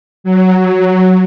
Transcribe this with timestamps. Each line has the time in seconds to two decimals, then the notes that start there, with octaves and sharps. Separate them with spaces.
0.24 F#3